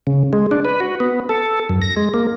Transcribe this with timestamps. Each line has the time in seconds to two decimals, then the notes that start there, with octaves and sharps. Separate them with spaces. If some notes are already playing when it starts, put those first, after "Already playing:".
0.07 C#3
0.33 G#3
0.51 D4
0.65 B4
0.80 F#4
1.00 B3
1.29 A4
1.69 F#2
1.82 A#6
1.97 G#3
2.14 A#3